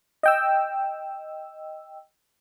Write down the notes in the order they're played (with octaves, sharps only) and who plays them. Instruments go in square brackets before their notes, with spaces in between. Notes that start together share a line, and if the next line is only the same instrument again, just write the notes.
[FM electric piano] D#5 G5 E6